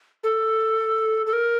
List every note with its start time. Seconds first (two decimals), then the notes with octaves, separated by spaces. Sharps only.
0.23 A4
1.26 A4
1.33 A#4